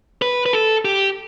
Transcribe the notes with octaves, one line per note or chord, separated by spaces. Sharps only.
B4
B4
A4
G4